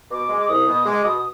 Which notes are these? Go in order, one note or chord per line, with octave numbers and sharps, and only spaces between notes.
B2 D6
G#3
D6
C2 D#6
B2
G#3 D6
B2 D#6
D#6